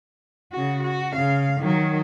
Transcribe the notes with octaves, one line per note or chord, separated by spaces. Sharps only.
C#3 F#4
F#4
C#3 F5
D#3 F#3